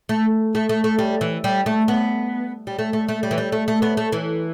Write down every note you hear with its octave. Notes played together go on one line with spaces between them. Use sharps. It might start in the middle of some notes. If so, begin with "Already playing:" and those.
A3
A3
A3
A3
G3
E3
G3
A3
B3
G3
A3
A3
A3
G3
E3
G3
A3
A3
B3
A3
E3